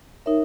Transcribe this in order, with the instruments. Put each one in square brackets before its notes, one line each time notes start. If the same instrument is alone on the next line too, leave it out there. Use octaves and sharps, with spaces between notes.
[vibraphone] D#4 A#4 C#5 E5